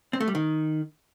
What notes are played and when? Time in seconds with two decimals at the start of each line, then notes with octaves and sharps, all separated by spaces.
0.13 C4
0.20 A3
0.28 G3
0.35 D#3